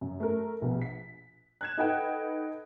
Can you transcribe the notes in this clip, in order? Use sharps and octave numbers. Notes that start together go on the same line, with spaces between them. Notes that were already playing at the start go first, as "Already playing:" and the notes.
F#2
A3 A#4
A#1 B2
B6
F#6 G#6 E7
D#4 A4 B4 D#5 F#5 G5